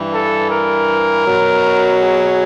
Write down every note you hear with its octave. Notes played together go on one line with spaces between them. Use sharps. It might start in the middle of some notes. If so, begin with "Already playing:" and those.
Already playing: G2 E3
A4
A#4
B2 F#3
G#4